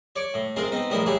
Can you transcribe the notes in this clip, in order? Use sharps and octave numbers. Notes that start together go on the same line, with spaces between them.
C#5 D5 C#6 D6
A2
G#3 C4 F4 A#4
B3 C4 D#4
A#1 A2 G3 E4 A#4 D#6
C2 E4 G4 G#4 C#5